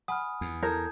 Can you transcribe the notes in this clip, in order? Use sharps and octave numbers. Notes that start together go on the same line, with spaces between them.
F#5 G#5 B5 D#6 F6
E2
E4 A4 A#4 A5 G6 G#6